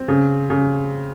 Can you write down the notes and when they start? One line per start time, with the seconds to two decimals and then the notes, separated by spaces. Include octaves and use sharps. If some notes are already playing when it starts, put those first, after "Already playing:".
Already playing: C4
0.08 C#3
0.50 C#3